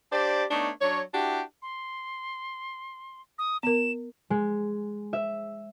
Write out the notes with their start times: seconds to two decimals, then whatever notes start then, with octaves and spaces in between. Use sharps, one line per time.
0.12 D4 G4 C5 D5
0.51 A3 B3 D4 D#4 C#5
0.81 F#3 D4 C#5
1.13 D4 E4 F#4 G4
1.62 C6
3.39 D#6
3.63 B3 A#4 E7
4.30 G#3
5.13 E5